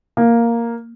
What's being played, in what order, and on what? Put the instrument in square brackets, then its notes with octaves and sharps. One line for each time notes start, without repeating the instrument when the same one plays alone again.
[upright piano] A#3